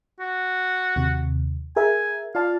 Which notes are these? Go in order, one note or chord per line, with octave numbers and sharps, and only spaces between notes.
F#4
D#2 C3
G#4 A#4 E5 G#5
F4 D5 F5 A5